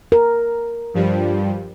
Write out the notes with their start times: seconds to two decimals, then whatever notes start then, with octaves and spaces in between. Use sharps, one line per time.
0.12 A#4
0.94 G2 F3 G3